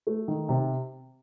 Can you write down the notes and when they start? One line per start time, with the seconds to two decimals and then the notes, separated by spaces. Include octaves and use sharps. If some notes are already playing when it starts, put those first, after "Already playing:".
0.07 A3
0.28 D#3
0.49 C3